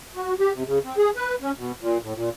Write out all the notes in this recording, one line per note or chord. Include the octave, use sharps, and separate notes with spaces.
F#4
G4
C3
C#3
C4
G#4
B4
C#4
B2
A#2
A2
A#2